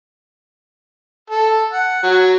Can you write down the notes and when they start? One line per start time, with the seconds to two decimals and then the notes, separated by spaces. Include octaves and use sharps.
1.30 A4
1.73 F#5
2.03 F#3